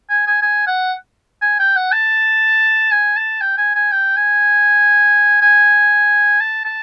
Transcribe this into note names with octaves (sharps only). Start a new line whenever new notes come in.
G#5
G#5
G#5
F#5
G#5
G5
F#5
A5
G#5
A5
G5
G#5
G#5
G5
G#5
G#5
A5
A5